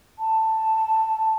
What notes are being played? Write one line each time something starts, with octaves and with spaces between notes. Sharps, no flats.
A5